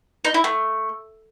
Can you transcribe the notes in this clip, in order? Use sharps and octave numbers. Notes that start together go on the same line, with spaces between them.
D#4
E4
A3